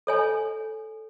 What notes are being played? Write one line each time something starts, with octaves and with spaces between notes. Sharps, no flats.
A4 C#5 G#5